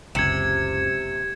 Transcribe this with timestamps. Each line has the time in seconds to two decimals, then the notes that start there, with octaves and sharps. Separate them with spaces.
0.15 F#1 C#2 C3 G#6 C#7 E7